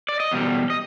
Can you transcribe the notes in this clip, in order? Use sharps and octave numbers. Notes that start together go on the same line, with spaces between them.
D5
D#5
E2 B2 G3
D#5